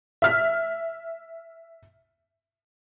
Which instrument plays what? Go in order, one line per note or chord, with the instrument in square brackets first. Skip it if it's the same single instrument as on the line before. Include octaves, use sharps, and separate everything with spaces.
[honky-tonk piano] E5 F6 B6